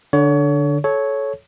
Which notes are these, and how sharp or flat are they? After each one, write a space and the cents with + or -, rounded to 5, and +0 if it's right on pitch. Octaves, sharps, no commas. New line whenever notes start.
D3 +0 C#5 +30
A4 -25 C#5 +0